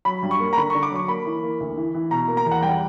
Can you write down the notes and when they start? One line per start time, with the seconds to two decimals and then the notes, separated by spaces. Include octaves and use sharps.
0.05 F#3 B5
0.23 G2
0.31 C#6
0.40 A#3
0.53 A#5
0.57 D3 B5
0.70 D3 C#6
0.83 D6
0.91 F#3 C#6
1.08 A#3 B5
1.26 E3
1.43 A#3
1.60 D2
1.77 E3
1.95 E3
2.11 B2 A#5
2.28 A#3
2.37 A#5
2.46 E2
2.51 F#5
2.63 G3 G5